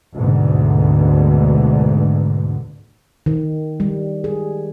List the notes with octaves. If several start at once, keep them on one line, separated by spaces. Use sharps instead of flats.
G#1 D2 G#2 B2 D3
D#3
G3
G#4